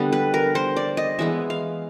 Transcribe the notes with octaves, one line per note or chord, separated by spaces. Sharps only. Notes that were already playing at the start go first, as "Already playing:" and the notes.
Already playing: D3 G3 B3
B4
A#4
C5
D5
D#5
E3 G#3 B3 E5
F5